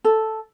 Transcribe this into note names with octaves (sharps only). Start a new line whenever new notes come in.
A4